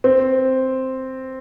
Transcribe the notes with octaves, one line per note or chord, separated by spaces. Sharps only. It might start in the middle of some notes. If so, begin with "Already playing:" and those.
C4